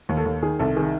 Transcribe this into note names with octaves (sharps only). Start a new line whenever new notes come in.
D#2
A4
D#2
D#3 G#4
C2 A4
D#3 G#4